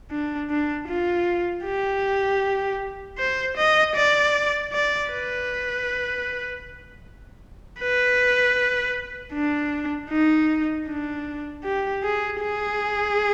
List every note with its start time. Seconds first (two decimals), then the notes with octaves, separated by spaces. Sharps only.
0.11 D4
0.50 D4
0.88 F4
1.65 G4
3.18 C5
3.57 D#5
3.95 D5
4.72 D5
5.11 B4
7.80 B4
9.33 D4
10.10 D#4
10.87 D4
11.64 G4
12.03 G#4
12.40 G#4